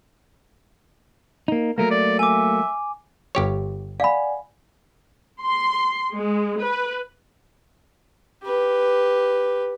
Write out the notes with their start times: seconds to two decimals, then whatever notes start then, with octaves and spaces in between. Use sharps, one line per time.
1.48 A#3 D#4
1.78 F#3 A3 A#3 A#4
1.91 D5
2.19 E5 G#5 D6
3.35 G1 G4 C#5
4.00 D5 F5 F#5 G#5 B5
5.41 C6
6.13 G#3
6.63 B4
8.43 G4 B4